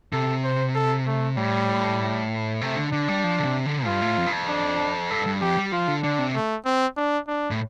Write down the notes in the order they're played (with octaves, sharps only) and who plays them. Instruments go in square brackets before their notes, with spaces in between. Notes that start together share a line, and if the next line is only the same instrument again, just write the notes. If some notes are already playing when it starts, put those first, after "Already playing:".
[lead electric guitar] C3 [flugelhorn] A4
[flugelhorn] C5
A4
A3
[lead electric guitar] A2 [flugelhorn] G3
[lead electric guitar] C3 [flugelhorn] A3
[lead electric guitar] D3
[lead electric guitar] D3 [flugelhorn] D4
[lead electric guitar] G3
F3
D3
C3
D3
[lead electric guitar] G2 [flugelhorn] F4
[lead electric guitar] A2
F2
G2
F2
[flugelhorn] D4
[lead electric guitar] G2 [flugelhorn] A4
[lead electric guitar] G2
[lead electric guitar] F2 [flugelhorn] G4
[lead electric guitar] G3
[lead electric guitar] F3 [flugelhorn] F4
[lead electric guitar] D3
[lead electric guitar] D3 [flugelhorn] D4
[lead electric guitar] C3
[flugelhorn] A3
C4
D4
D4
[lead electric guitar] A2